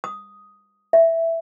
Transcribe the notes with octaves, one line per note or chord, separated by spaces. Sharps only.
D#6
E5